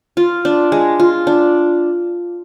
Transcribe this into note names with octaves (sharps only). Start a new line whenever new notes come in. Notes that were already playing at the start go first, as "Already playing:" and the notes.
F4
D4
G#3
F4
D4